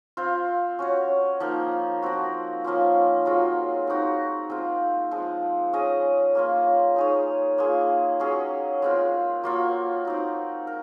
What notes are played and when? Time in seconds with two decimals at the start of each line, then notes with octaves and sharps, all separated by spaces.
0.17 C4 F4 C5 F5
0.79 C#4 F#4 C#5
1.40 F3 A#3 D#4 A#4
2.02 F3 C4 F#4
2.64 F3 A#3 C#4 F4
3.26 F#3 C4 F4 G#4
3.87 C4 D#4 F#4
4.50 G#3 C4 F4
5.11 F3 G#3 C4
5.73 C#4 G#4 D#5
6.35 A#3 C#4 F4
6.96 D#4 G#4 C#5
7.58 A#3 F4 G#4
8.20 F#3 C#4 G#4
8.82 G#3 C4 F4
9.44 F#3 A#3 F4
10.05 C4 D#4 F#4
10.67 A#4